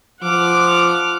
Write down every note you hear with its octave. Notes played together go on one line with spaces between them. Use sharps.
F3 F#5 D6 F6